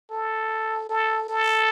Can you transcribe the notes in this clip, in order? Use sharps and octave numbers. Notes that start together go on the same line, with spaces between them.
A4
A4
A4